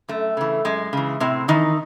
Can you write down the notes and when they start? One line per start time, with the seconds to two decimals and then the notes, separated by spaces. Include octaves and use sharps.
0.09 F#2 A3
0.37 C#3 E3
0.65 F#2 G#3
0.93 C#3 E3
1.20 A2 C3 C4
1.48 D#3 E3 D#4